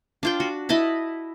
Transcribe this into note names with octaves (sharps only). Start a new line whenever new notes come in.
D4 F4 G5
F#4
E4 D#5 A5 B5